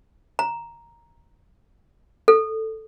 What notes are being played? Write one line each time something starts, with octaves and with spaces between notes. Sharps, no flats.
A#5
A4